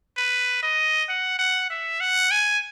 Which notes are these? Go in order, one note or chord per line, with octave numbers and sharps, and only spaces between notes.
B4
D#5
F#5
F#5
E5
F#5
G#5